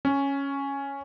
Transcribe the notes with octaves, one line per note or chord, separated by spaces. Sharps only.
C#4